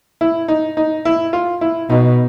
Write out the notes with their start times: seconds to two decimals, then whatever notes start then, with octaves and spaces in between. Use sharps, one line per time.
0.21 E4
0.48 D#4
0.77 D#4
1.05 E4
1.33 F4
1.61 E4
1.90 B2 D#4